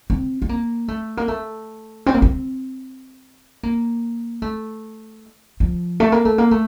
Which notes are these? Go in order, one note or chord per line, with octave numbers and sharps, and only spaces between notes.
C4
C4
A#3
A3
A#3
A3
C4
A#3
C4
A#3
A3
F3
A3
A#3
A3
A#3
A3